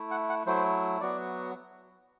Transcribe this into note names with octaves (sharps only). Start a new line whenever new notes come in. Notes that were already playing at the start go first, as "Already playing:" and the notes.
Already playing: A3 E4
F#5
F#5
F#3 A3 E4 C5
F#3 B3 F#4 D5